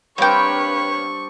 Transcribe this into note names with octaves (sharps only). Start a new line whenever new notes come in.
G3 A#3 C4 D4 B4 C#5 G5 C#6